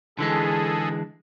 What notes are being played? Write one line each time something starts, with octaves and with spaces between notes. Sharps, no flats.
D3 E3 G#3 G#4 A4